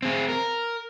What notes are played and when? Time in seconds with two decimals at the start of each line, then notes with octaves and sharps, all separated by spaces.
0.02 C4 G#4
0.29 A#4